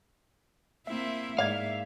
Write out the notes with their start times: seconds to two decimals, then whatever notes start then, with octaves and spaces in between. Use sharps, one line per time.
0.87 A#3 C4 E4 E5
1.38 G#2 A#3 D5 F5 G#6